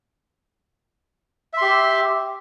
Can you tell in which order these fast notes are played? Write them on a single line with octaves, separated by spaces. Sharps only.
E5 C6 G4